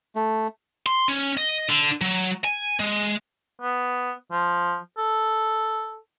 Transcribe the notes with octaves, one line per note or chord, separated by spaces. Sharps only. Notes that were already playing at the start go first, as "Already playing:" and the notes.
A3
C6
C#4
D#5
D3
F#3
G#5
G#3
B3
F3
A4